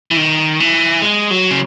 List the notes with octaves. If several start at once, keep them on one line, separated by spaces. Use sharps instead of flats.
E3
D#3
E3
G#3
F#3
C#3